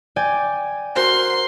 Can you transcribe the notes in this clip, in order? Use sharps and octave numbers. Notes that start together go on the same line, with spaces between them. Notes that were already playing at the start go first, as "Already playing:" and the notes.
D5 G5 G#5
F#4 A#4 C5 C6